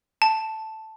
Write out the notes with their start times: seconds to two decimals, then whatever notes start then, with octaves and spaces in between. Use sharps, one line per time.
0.22 A5